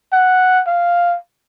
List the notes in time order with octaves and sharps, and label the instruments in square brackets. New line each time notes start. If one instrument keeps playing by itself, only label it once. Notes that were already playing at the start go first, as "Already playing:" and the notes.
[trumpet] F#5
F5